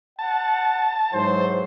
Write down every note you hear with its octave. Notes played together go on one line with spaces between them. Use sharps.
F#5 A5
G#2 E3 F#3 C5